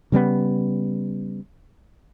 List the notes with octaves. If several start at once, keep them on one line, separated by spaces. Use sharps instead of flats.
C#3 G3 A3 B3